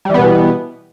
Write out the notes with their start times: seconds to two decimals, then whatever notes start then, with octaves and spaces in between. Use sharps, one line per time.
0.05 G3
0.10 E3
0.14 B3
0.19 B2